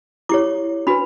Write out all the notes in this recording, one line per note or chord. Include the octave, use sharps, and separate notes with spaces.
E4 G4 C#5 D6
D4 F#4 B4 B5